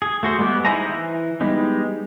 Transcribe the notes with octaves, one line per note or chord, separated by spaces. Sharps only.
G#4
A3 F#4 C5
G3 G#3 B3 G4 D6
D#4 E4 C5 G#5 A#5
E3
G3 G#3 B3 D#4